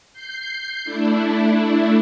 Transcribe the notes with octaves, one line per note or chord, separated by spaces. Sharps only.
G6 C7
A3 D4 E4